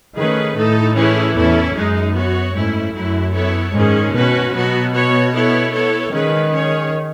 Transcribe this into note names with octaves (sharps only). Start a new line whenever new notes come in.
D#3 A3 C#4 G#4 B4
A2 A3 D#4 A4
E3 A3 C#4 E4 G#4
E2 C#4 E4 A4
F#2 G#3 D#4 G#4
B3 F#4 C#5
G#2 A3 C#4 E4
F#2 F#3 A3 E4
B3 E4 A4 C#5
G#2 D#3 G#3 C#4 G#4
B2 C#4 F#4 B4
B2 F#3 B3 F#4
B3 F#4 C#5
B3 E4 A4 C#5
B3 E4 A4 C#5
D#3 G#3 C#4 G#4 B4
C#4 G#4 C#5